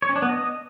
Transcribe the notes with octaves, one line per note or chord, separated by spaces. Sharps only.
C#5
C#4
D4
B3
D#5